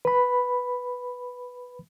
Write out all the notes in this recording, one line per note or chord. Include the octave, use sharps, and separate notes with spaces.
B4 B5